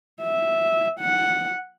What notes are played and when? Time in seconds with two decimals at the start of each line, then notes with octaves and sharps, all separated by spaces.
0.22 E5
1.00 F#5